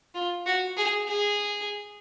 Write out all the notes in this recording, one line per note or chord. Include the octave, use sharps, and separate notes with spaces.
F4
F#4
G#4
G#4